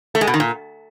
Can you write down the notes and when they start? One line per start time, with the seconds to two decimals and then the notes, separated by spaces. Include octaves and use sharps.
0.15 A3
0.21 G#3
0.27 B2
0.34 D#3
0.40 A#2